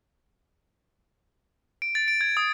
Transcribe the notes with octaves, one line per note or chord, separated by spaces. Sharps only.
D7
A6
D7
G#6
D#6